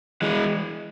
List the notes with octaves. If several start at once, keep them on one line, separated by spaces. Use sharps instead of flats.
E3 G#3